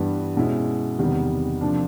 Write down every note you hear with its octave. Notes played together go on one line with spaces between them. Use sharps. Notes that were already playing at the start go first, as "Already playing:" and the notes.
Already playing: G2 E3 G3 B3
B2 G#3 C#4 E4
E2 C3 D#3 G3 B3
C3 F3 A#3 D4